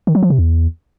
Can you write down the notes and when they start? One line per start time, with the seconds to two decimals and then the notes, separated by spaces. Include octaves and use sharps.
0.07 D#3
0.15 F#3
0.23 F3
0.30 C3
0.38 E2